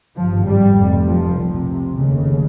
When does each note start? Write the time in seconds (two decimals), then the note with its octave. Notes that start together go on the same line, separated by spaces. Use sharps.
0.16 G#1 G2 F3
0.46 G3
0.77 F1 F2 C3
1.07 F3
1.38 C2 C3
1.98 F1 D#2 C#3